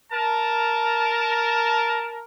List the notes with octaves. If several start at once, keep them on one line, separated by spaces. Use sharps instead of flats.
A#4 A5